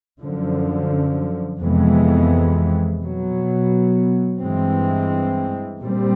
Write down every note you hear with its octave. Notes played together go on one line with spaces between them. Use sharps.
F#2 D3 F3
F2 C3 E3 G#3 B3
B2 F#3 B3
G2 E3 G#3 C4
A#2 G3 C4